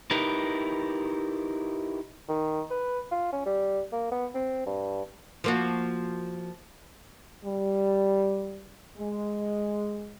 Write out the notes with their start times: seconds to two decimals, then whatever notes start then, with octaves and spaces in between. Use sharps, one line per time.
0.11 D#4 E4 G4 A#4 B4
2.28 D#3
2.71 B4
3.11 F4
3.33 C#4
3.46 G3
3.92 A#3
4.12 B3
4.35 C4
4.66 G2
5.44 F3 A#3 F#4
7.45 G3
8.98 G#3